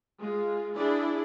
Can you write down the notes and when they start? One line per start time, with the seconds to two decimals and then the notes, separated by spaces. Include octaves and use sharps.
0.20 G#3 F4
0.75 D4 E4 G#4 D5